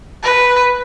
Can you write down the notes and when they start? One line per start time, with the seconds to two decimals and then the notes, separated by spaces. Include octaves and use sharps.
0.23 B4